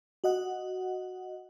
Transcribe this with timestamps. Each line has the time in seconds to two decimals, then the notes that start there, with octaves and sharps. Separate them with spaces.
0.24 F#4 D#5 F#5